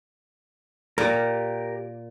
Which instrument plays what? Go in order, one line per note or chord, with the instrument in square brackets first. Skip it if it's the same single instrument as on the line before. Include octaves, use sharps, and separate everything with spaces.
[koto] A#2 [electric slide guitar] G4 A#4